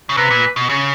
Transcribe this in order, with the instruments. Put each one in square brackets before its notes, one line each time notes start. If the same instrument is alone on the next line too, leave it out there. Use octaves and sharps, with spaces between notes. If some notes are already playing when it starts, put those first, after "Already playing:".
[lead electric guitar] C#3
[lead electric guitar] C3 [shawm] B4
[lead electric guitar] A#2
B2
C#3